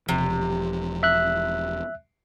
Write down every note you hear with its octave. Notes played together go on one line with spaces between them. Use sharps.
E1 C3 F3
E5 F#6